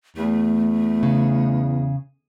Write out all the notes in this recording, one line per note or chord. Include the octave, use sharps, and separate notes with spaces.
E2 A3
C#3